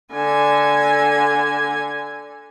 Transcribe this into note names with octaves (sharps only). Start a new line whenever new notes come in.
D3 G#5